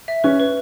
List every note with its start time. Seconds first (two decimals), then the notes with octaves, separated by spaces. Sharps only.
0.08 E5
0.24 C#4 B4
0.39 B4